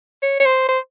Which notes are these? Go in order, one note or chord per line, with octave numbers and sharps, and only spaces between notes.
C#5
C#5
C5
C5